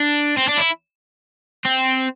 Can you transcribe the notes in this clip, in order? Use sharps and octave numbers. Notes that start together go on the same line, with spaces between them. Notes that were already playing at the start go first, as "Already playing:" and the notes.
Already playing: D4
C4
D4
E4
C4